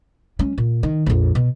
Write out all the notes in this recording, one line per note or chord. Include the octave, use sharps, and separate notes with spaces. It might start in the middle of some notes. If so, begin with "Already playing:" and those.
G#3 C#4
A#2
D#3
A#1 F2
B2